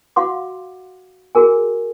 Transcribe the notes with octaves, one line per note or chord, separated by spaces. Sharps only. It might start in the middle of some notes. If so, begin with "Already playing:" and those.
F#4 F5 F#5 C6 D6
F#4 G#4 A#4 G#5